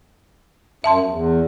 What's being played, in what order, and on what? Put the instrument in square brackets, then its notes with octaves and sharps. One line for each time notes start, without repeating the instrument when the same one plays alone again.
[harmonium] F#2 [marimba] E5 A5 C6
[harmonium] E2